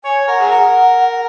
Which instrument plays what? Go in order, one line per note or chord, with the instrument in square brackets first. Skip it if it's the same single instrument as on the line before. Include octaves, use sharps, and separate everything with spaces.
[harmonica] C#5 [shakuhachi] G#5
[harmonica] A#4 [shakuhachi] F#5
[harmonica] G#4
[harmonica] A#4 [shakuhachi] F#5